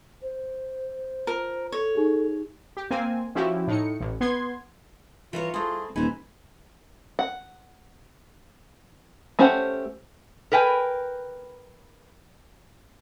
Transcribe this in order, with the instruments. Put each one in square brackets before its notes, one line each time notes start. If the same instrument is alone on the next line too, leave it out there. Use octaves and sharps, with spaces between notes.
[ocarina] C5
[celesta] F4 [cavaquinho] A#4
[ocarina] A4 [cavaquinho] C#5
[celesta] D#4 G4 G#4
[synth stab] G4
A#3 C4 G#5
F3 C#4 E4 F#4 G4
A2 D#4 C#7
A1
B3 C6 G#6
[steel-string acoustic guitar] E3 A#4 C#5 [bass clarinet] F4
[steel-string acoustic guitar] A3 C4 [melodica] E4 G#4 C6
[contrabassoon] D#1 [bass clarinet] E3 [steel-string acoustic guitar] D#4 C5 [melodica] G#5 B5
[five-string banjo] F#5
A3 C#4 G4 C5 F#5
[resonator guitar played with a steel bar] A#4 B4 G5 G#5